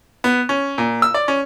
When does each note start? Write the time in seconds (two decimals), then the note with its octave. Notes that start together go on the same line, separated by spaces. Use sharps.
0.24 B3
0.49 C#4
0.78 A#2
1.02 E6
1.14 D5
1.28 C#4